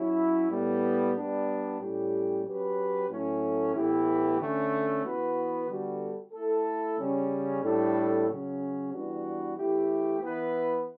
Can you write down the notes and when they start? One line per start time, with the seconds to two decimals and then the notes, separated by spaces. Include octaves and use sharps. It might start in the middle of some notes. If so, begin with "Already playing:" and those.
Already playing: F#3 C#4 E4
0.50 A2 G3 B3
1.15 G3 B3 D4
1.80 A2 G3 C#4 G4
2.45 F#3 C#4 G4 B4
3.09 A2 F#3 A3 C#4
3.74 A2 E3 B3 E4 G4
4.38 D3 A3 C#4
5.04 E3 B3 F#4 B4
5.68 D3 G3 B3 F#4 A4
6.32 A3 E4 A4
6.98 C#3 G3 C#4
7.62 A2 G3 D4 A4
8.27 C#3 F#3 C#4
8.92 E3 G3 B3 D4 F#4
9.57 E3 A3 E4 G4
10.21 E3 B3 E4 B4